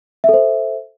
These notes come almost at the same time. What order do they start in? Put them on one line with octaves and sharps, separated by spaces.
E5 A4 C5